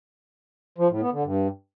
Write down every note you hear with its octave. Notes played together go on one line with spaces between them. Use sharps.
F3
A2
B3
D3
G2